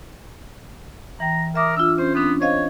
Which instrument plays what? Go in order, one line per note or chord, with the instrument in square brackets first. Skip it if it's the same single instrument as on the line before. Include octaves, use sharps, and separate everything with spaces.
[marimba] E3 G5 [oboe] A#5
[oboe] A#4 [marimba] E5 D6 D#6
[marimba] D4 F4 [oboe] E6
[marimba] C#4 [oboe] C5
[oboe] B3 [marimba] C4 D4
[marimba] C5 D#5 F5 [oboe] C#5